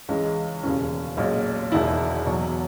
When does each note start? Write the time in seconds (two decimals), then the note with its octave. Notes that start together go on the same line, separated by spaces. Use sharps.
0.09 C#2 C#3 E3 G#3
0.63 E1 D#2 C#3 E3 C#4
1.17 B1 A#2 G#3
1.72 E1 E2 D#3 E4
2.26 E2 B2 F#3